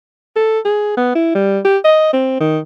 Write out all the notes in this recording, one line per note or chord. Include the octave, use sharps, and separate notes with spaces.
A4
G#4
B3
E4
G3
G4
D#5
C4
D#3